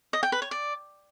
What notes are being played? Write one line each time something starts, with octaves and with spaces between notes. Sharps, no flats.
D#5
G5
B4
C#5
D5